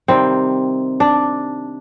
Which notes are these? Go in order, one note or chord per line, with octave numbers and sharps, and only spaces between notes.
C3 D#3 G3 C4
D4